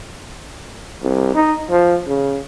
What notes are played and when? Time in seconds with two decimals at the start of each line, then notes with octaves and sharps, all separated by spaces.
1.03 C2
1.35 D#4
1.70 F3
2.08 C#3